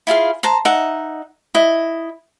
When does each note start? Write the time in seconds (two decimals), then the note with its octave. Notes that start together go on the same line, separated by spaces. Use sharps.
0.07 E4 F4 G#4 F5
0.43 C5 A5 A#5
0.65 D#4 E5 F#5
1.55 E4 D#5